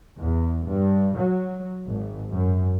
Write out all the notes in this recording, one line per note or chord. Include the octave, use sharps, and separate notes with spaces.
E2
G2
F#3
G#1
F#2